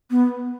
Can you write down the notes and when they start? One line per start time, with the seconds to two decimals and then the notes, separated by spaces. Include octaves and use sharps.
0.11 B3